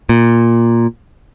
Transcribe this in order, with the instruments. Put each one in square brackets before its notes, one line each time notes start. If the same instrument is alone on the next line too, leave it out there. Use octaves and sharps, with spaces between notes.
[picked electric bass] A#2